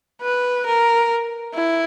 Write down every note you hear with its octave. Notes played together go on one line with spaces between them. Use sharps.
B4
A#4
E4